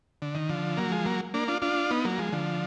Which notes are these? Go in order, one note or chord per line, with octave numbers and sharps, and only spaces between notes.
D3
D#3
D3 F3
F#3 A#3
F3 G#3
F#3 A#3
A#3 D4
D4 F4
D4 F4
B3 D#4
F#3 A#3
F3 G#3
D3 F3